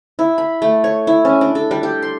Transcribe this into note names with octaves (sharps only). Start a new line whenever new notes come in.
E4
B5
A3
C#5
E4
C#4
D4
A4
G3
G4
C6